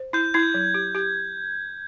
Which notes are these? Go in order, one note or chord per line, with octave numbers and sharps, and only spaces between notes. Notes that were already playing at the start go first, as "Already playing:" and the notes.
Already playing: C5
E4 G6
E4 G#6
F#3
G4
G4